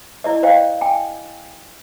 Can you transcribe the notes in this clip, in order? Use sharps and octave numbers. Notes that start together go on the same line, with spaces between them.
E4 D5 D#5
C5 D5 D#5 F5 G5
G5 G#5